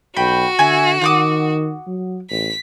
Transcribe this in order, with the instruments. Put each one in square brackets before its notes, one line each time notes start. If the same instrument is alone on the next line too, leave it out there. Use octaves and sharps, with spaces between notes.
[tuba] B1 [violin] F#4 [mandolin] G5 B5
[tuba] D3 [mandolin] E5 G#5
[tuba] D#3 [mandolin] F#5 D6 D#6
[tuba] F#3
[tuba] A1 [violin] B6